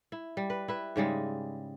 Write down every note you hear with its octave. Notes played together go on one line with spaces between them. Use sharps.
E4
G3
B4
E4 B4
G#2 C#3 G3 G#3